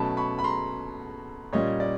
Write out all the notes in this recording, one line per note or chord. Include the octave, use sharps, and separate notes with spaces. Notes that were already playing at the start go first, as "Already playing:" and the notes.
Already playing: B2 F#3 A3 C#4 A5 B5
B5 C#6
B5
A#5 C6
A#2 G3 A#3 C#4 C#5 D#5
D5